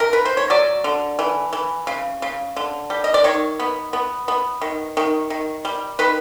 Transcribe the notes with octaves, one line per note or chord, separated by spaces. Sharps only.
A#4
B4
C5
C#5
F#3 D5
D3
E3
E3
C#3
C#3
D3
G3
D#5
D5
D#3 C#5
B3
B3
B3
D#3
D#3
D#3
G3
D#3 B4